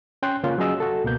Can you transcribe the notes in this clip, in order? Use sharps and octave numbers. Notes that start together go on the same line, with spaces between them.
C#4 G5 C6 F#6
C#3 A#3 C#4 F4
F#3 C#4 G#4 D#5 E6
F#4 A4
C#2 B2 A#3 G6